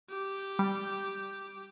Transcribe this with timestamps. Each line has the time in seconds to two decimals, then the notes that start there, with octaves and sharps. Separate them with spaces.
0.11 G4
0.59 G3